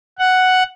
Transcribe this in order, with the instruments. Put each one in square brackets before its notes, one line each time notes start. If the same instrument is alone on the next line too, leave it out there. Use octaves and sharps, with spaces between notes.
[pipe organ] F#5